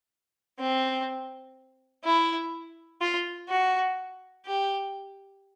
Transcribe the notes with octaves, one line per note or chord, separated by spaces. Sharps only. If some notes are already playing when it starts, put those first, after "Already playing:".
C4
E4
F4
F#4
G4